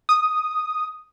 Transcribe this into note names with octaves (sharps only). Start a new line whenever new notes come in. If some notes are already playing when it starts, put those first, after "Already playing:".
D#6